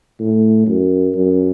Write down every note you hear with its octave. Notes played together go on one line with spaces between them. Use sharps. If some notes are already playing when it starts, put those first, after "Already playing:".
A2
F#2
F#2